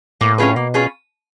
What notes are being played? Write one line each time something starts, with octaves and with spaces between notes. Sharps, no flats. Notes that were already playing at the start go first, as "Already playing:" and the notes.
A2 A#3
C#4 F4 G#4 B4
B2 A#3
C#4 F4 G#4 B4